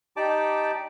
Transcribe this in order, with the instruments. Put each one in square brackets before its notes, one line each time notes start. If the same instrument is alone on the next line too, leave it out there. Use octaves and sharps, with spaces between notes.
[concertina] D#4 G4 D5 G5 A5 D6